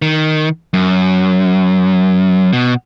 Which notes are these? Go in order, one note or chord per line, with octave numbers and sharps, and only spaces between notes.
D#3
F#2
B2